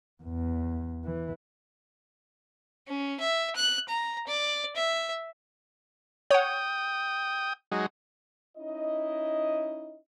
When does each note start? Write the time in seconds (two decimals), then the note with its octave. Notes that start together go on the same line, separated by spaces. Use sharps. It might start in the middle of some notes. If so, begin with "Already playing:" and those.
0.23 E2
1.05 E3
2.87 C#4
3.20 E5
3.56 F#6
3.89 A#5
4.27 D5
4.76 E5
6.31 C#5 F#5 G5 D#6
7.72 F#3 G#3 D#4
8.57 C#4 D#4 E4 D#5